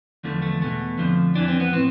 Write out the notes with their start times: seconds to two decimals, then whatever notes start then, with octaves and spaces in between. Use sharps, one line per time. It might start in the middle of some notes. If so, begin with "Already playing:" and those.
0.24 E2 D3 F3 A3
0.42 A3
0.61 E2 B2 A3
0.98 F2 D3 F3
1.35 F2 E3 D4
1.48 C4
1.60 B3
1.73 A2 C4